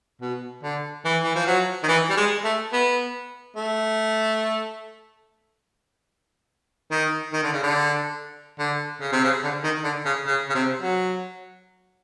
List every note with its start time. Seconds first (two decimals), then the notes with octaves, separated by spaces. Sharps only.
0.21 B2
0.63 D3
1.05 E3
1.24 E3
1.35 F3
1.47 F#3
1.83 D#3
1.88 E3
2.10 G3
2.17 G#3
2.44 A3
2.73 B3
3.56 A3
6.92 D#3
7.33 D#3
7.43 D3
7.53 C#3
7.63 D3
8.59 D3
9.01 C#3
9.12 C3
9.24 C#3
9.43 D3
9.64 D#3
9.84 D3
10.06 C#3
10.27 C#3
10.50 C#3
10.55 C3
10.82 F#3